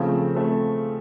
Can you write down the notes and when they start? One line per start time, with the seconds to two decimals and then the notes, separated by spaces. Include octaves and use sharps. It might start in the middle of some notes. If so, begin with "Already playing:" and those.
Already playing: C#3 F3 A3 C4
0.35 A3 C4